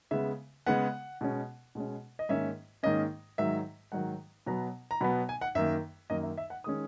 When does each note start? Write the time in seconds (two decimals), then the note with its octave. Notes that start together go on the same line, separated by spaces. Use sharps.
0.11 C#3 G#3 B3 E5
0.66 C#3 G#3 B3 F#5
1.21 B2 G#3 C#4
1.75 B2 G#3 C#4
2.19 D#5
2.29 G#2 D#3 A#3 C#4 E5
2.83 G#2 D#3 A#3 C#4 D#5
3.38 G#2 D#3 F#3 E5
3.92 G#2 D#3 F#3 F#5
4.46 B2 F#3 B3 A#5
4.91 A#5
5.01 B2 F#3 B3 B5
5.29 G#5
5.41 F#5
5.55 F#2 D#3 A#3 E5
6.10 F#2 D#3 A#3 D#5
6.23 E5
6.38 E5
6.50 F#5
6.64 D#3 G#3 C#4 D#6